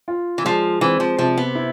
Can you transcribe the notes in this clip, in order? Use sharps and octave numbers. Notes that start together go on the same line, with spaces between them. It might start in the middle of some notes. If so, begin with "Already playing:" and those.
F4
E3
F3 G#3
E3 C4
F3
C3 F3
B3
E4